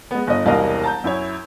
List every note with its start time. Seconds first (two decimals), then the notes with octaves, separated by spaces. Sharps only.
0.11 G#3 B3
0.27 G1 D#5
0.45 E1 C2 G3 A#4 D#5 F5
0.84 A5 A#5 G6
1.04 F#2 E4 C#5